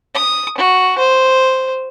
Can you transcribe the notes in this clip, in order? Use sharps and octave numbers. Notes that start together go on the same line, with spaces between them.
D#6
F#4
C5